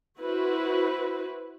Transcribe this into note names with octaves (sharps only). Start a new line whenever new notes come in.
E4 F#4 B4 C5